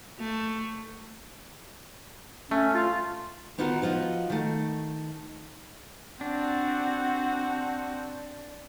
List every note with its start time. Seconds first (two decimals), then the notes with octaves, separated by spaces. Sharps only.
0.19 A3
2.51 A3 C#4
2.74 F4
3.58 D#3 B3 D#4 F4 F#4 A#4
3.82 F3 F4 F#4 D#5
4.30 D#3 A3
6.21 C4 D4 F#4 F#5